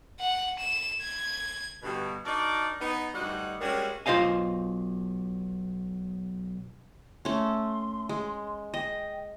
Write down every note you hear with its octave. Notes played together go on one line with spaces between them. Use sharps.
F#5
E7
G#6
G2 B2 D3
D4 D#4 F#4 A#4 D5
B3 D#4
D2 G2 G3 D#4 F#4 F#5
G3 G#3 A#3 C#4 D4 F#4
B1 F4 C5 D#5 F5 G#5
A3 C#4 C6
G#3
D#5 G5